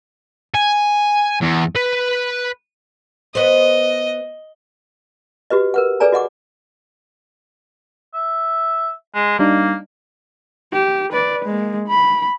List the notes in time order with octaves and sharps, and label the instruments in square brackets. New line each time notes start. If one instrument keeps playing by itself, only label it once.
[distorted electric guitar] G#5
E2
B4
[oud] B3 C5 [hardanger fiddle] D#5
[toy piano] F#4 G4 B4 D#5
A#4 B4 F#5
G#4 A4 B4 D5 G#5 A#5
F#4 D#5 F#5 D6
[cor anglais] E5
G#3
[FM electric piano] G3 D4 D#4 [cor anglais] A#3
[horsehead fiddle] G4
B4 D5
G#3 A#3
B5